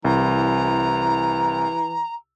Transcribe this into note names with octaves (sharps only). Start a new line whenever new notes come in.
C2 E3 A#5